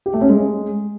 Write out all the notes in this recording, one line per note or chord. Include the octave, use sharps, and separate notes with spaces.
G4
A3
C#4
G#3